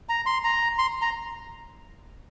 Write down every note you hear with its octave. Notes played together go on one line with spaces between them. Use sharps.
A#5
C6
A#5
C6
A#5